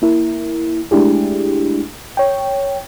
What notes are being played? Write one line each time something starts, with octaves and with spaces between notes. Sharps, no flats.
A#3 E4 A#4
G#3 A3 D4 E4 G4 G#4
C#5 G5